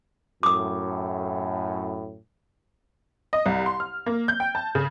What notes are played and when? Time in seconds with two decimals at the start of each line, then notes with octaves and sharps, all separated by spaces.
0.43 F#2 A2 D6 D#6
3.33 D#5
3.46 C2
3.66 C6
3.80 F6
4.06 A#3
4.28 G6
4.40 G5
4.55 A5
4.75 C#3